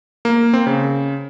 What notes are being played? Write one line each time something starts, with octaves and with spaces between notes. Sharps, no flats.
A#3
C4
C#3